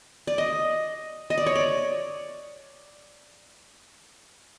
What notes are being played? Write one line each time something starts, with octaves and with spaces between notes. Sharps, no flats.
D5
D#5
D#5
D5
C#5
D5